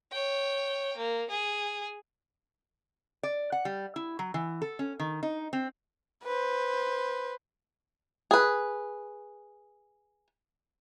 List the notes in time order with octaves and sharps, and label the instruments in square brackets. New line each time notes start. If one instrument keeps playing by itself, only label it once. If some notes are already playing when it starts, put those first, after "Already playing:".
[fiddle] C#5 G5
A#3
G#4
[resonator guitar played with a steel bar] D5
F#5
G3
E4
F#3
E3
A4
C#4
D#3
D#4
C4
[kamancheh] B4 C5
[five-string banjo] G#4 B4